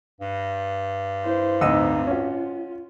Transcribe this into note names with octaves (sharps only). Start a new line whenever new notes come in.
G2
E4 C5
D2 C4 D#4 C5 D#5 F#5 E6
C#4 F4 F#4